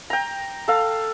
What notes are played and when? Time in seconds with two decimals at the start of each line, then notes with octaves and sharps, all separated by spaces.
0.10 G5 A#5
0.68 A4 F5